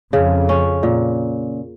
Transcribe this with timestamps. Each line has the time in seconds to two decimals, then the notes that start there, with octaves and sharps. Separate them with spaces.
0.13 F2 C#3
0.49 C#4
0.83 A#2